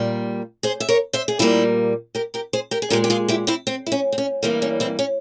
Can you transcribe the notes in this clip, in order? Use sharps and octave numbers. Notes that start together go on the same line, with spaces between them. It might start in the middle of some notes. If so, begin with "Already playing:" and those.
Already playing: A#2 G3 A#3
G#4 C5
E5
A#4 C#5
C5 E5
G#4
A#2 G3 A#3 E4 G4
G4 A#4
G4 A#4
G#4 C5
G4 A#4
G#4
A#2 G#3 G4 A#4
G4
F4 G#4
E4 G4
C4 E4
C4
E4
C#4
C4
C#4
G2 E3 G3 A#3 C4
C#4
C4 E4
C#4